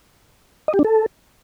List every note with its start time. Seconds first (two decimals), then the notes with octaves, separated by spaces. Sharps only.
0.68 D#5
0.74 G4
0.79 D4
0.85 A4